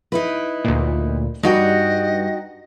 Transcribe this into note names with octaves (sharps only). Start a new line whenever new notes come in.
D#4 E4 B4
D2 A#2
G2 D#4 F#4 D#5 G5